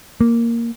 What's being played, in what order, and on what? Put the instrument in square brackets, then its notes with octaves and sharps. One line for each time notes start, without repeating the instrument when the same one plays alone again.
[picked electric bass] A#3